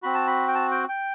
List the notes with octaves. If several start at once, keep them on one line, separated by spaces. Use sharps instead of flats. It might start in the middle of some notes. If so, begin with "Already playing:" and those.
C4 F#4 B5
A5
B5
G5
A5
G5
G5